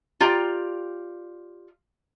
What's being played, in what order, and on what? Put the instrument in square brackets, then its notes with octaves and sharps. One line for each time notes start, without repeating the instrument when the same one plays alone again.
[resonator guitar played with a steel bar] F4 G4 D5 A#5